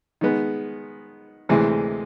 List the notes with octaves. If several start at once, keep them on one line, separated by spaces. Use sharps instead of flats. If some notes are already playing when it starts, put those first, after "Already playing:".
D#3 G#3 B3
D2 C3 E3 G#3